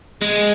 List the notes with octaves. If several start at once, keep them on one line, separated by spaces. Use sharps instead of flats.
G#3